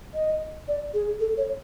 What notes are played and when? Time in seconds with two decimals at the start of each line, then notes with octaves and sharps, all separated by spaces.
0.14 D#5
0.68 D5
0.94 G#4
1.20 A4
1.37 C#5